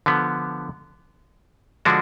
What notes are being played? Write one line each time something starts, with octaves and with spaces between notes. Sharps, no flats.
D3 F3 B3
D3 F3 G#3 D4 F#4